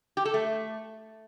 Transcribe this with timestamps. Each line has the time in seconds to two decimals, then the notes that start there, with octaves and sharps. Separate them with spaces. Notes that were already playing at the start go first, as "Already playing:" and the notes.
0.17 G4
0.25 A4
0.34 A3